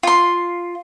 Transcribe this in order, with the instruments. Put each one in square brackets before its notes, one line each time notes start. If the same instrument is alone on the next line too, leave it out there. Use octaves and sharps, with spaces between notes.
[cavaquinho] F4 C6